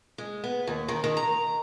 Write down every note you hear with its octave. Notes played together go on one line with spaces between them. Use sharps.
G#3
B3
D#2
D#3
D#3
A#5